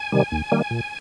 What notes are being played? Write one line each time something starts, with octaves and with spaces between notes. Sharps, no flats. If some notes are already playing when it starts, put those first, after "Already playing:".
Already playing: G#5
C3 D#3 G3
D#2
D#3 G3 A#3
A#2